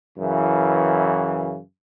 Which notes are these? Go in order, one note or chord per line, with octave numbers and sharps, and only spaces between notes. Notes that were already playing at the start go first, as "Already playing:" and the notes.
F#2 C#3 E3